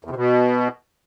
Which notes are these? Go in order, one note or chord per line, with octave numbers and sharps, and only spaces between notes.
E2
C3
B2